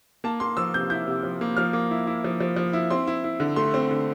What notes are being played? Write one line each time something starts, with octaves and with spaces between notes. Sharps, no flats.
A#3 A5
A#3 C6
F3 E6
C3 G6
E4 G6
C3
F3
A#3
F3 F6
A#3
E4
E4
F3
F3
F3
E4
C4 C6
E4
E4
D3
A3 C6
C4
D3